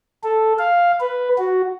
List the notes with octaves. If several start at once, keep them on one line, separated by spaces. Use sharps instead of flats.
A4
F5
B4
F#4